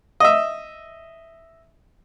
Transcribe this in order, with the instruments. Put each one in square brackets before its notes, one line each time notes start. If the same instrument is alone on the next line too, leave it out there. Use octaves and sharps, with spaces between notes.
[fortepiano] D#5 E5